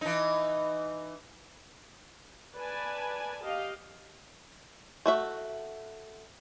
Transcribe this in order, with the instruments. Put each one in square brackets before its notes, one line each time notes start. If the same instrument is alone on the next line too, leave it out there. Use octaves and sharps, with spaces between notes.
[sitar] E3 D#4
[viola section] B4 D5 G#5 A5
G4 D#5 F5
[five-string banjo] A3 F#4 E5